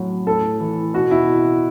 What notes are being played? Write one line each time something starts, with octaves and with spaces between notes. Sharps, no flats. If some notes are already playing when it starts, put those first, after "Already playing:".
Already playing: A2 F#3
A2 A4
E3
B2 F#4
E4